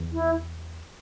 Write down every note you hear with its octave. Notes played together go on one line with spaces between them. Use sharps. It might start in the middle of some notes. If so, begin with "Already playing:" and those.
Already playing: E2
E4